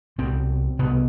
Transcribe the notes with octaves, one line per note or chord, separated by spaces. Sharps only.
C2 B2 C4
C2 B2 B3